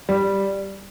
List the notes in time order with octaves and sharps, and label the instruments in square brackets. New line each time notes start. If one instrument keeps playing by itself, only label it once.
[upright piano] G3